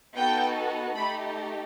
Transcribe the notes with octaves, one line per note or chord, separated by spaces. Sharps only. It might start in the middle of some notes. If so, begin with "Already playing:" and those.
B3 D#4 F#4 A4 G5
A3 D#4 G4 B5